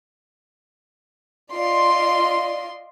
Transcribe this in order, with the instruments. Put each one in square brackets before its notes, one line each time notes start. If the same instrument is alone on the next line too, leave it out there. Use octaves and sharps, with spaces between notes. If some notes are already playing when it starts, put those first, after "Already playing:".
[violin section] F4 D5 D#5 C6